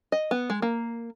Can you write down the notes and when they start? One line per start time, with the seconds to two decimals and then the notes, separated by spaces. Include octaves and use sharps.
0.12 D#5
0.31 B3
0.50 G#3
0.62 A#3